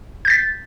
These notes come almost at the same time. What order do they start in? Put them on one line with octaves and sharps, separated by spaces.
G6 A6 B6